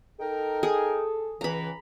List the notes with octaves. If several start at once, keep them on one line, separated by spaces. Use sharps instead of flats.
D#4 A4 A#4 G5
G#4
C#2 E3 A#5 B5